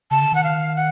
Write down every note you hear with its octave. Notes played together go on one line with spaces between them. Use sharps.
C#3 A5
D3
D#3 F#5
F5
F#5